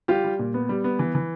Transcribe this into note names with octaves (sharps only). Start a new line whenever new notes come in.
G3 F4 G4
G3
A#2
B3
G3
B3
E3
E3